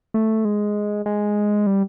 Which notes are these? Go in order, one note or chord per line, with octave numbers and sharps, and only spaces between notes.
A3
G#3
G#3
G3